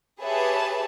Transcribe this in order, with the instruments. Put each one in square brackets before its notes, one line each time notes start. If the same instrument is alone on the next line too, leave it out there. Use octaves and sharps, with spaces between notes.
[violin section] G4 G#4 B4 C#5 E5 A5